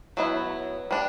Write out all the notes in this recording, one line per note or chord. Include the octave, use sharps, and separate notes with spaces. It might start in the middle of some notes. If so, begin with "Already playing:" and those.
F#3 B3 E4
G3 D4